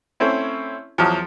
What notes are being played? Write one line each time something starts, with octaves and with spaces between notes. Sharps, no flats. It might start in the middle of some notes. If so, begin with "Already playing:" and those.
A3 C4 C#4 E4
E2 F3 F#3